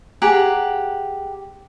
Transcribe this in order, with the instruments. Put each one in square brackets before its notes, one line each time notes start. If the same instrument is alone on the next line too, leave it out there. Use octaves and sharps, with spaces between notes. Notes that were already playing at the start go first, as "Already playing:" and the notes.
[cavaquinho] G4 G#4 F#5 A#5